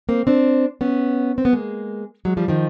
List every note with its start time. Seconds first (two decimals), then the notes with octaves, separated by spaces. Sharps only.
0.09 A#3 C4
0.27 C4 D4
0.81 B3 C#4
1.38 C4
1.45 B3
1.53 G#3 A#3
2.25 F#3 G#3
2.37 F3 G3
2.48 D#3 F3